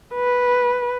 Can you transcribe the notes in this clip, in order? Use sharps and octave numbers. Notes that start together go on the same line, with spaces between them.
B4